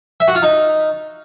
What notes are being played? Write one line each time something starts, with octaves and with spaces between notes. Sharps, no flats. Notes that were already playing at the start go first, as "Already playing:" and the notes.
E5
F#4
F4
D#4